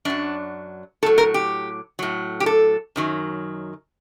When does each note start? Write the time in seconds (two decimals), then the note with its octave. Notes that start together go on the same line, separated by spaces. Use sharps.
0.05 F#2 F#3 D4
1.03 A2 A4
1.06 F#3
1.18 A#4
1.34 G4
1.99 A2 F#3
2.40 G4
2.46 A4
2.96 F#2 D#3 F#3